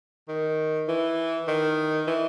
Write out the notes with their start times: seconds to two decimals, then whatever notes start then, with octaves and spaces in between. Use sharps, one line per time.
0.28 D#3
0.88 E3
1.48 D#3
2.07 E3